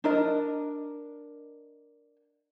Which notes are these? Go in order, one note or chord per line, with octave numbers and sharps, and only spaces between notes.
D4 A#4 D#5